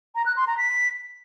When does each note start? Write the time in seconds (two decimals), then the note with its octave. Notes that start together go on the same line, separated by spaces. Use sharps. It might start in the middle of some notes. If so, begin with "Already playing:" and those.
0.15 A#5
0.26 F#6
0.36 C6
0.47 A#5
0.58 B6